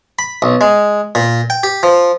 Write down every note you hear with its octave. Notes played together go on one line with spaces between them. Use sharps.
B5
B1
G#3
A#2
G5
G4
F3